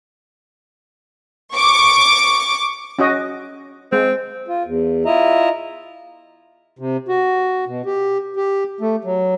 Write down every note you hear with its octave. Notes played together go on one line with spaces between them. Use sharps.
C#6 D6 D7
C#4 F#4 D#5
G#3 C4
F4
E2
E4 F4 D#5 E5 A#5
C3
F#4
B2
G4
G4
A3
F#3